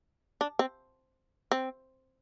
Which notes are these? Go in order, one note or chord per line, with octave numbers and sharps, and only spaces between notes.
D4
C4
C4